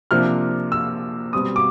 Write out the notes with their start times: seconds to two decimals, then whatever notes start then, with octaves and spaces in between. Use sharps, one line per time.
0.11 C3 F3 A#3 D4 F6
0.72 E6
1.33 B2 G3 C4 D#6
1.56 D6